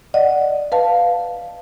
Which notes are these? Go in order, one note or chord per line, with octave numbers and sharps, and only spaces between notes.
D5 D#5 F#5
B4 F5 A5